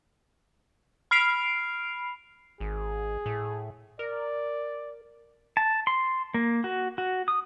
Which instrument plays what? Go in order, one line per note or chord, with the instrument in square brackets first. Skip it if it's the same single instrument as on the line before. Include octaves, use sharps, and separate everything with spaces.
[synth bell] B5 F6 C7 D7 F7
[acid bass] G#1 [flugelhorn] G#4
[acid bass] A2
[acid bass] A#4 [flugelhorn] D5
[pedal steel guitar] A5
C6
A#3
F#4
F#4
D#6